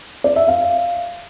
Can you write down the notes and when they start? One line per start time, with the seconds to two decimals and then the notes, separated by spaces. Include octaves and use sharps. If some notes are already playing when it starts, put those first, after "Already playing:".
0.24 D5
0.36 E5
0.48 F5